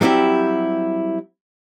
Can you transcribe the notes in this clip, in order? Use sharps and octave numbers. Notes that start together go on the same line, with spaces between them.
F#3 G3 C4 E4 G4